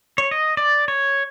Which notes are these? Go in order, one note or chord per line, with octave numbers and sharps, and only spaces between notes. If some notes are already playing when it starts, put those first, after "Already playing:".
C#5
D#5
D5
C#5